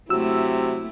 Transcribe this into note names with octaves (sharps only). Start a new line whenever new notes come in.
C3 F#3 A3 E4 E6